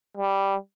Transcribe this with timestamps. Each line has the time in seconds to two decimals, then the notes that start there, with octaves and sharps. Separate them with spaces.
0.17 G3